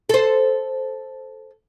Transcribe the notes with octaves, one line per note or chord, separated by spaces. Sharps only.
A4 C5